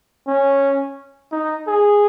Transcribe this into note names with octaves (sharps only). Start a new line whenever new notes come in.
C#4
D#4
G#4